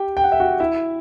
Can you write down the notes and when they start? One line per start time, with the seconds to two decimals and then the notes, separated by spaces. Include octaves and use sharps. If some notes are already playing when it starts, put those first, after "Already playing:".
Already playing: G4 G5
0.17 G5
0.24 F#5
0.32 E5
0.40 F#4 F#5
0.60 E4 E5